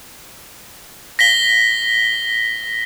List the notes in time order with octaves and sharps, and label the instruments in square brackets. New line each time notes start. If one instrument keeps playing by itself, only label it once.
[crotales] A#6 B6 G7